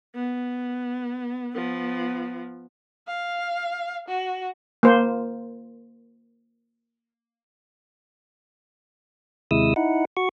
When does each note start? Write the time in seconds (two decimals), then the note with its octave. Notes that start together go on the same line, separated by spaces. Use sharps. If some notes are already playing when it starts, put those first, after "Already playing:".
0.15 B3
1.55 F3 B3
3.07 F5
4.08 F#4
4.83 A#3 C5
9.51 D#2 C3 G#3 E4 D#6 E6
9.76 D#4 E4 F#5
10.17 F#4 C#6